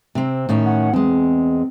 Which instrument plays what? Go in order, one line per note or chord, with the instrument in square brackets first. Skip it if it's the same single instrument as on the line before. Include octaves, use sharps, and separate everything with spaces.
[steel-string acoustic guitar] C3 C4
A2 D#3 C#4
[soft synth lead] F#5
[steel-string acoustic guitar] E2 G#3 [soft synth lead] C4